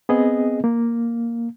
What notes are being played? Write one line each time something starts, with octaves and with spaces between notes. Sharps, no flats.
B3 C4 G#4 D#5
A#3